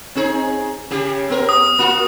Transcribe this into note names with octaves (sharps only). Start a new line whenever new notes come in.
C4 D#4 G#4
C#3 G4 G#4
B3 A#4
D#6
A#3 F4 F#4